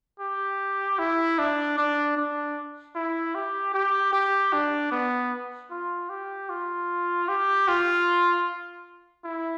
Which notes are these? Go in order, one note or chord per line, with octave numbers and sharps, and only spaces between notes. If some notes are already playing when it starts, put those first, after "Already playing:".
G4
E4
D4
D4
D4
E4
G4
G4
G4
D4
B3
F4
G4
F4
G4
F4
E4